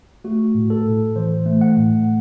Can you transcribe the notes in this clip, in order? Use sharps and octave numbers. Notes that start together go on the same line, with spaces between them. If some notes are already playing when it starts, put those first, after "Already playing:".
A3 F#4
A2
A4
A2
E3 C5
A3
F#5
A2